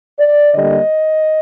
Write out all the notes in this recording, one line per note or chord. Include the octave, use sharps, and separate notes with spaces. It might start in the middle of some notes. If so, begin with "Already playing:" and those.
D5
D3 G3 A#3 D#5